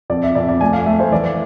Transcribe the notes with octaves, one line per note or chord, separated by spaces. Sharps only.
F2 D5
E5
F2 D5
D5
A3 G#5
F5
A3 E5
C5
E3 D5